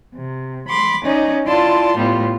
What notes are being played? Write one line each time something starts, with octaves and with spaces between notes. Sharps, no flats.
C3
B5 C6 D6
C#4 D#4 D5 D#5
E4 F4 D5 A5 C6
A2 G3 B3 F4